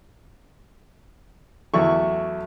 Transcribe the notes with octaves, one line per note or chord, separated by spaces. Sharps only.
E2 F#3 E4 F#4 A4 C#6